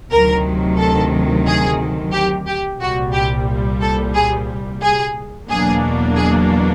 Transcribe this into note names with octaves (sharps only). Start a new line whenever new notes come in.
D2 C3 D#3 F#3 A#4
A4
G#4
G4
G4
C2 A#2 G3 F#4
G4
A4
G#4
G#4
E2 B2 F#3 A#3 D4 G#4
G#4